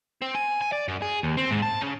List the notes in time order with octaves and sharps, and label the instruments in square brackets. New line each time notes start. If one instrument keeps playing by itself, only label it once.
[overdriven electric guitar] C4
G#5
G#5
D5
F#2
G#4
D#2
C4
G#2
A5
C#3